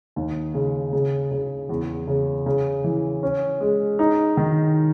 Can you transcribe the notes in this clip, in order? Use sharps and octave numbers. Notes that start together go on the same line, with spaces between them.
D#2
C#3
C#3
C#3
E2
C#3
C#3
E3
C#4
G#3
D#4
D#3